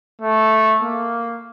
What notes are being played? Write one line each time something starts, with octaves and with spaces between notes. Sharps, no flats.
A3
A#3